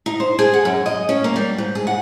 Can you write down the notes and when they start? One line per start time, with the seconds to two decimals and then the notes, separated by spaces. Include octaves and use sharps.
0.06 D#4
0.20 C5
0.39 G#4
0.54 F#5
0.65 F#2
0.86 D#5
1.09 C#4
1.24 A#3
1.36 G3
1.58 G#2
1.75 G#4
1.87 F#5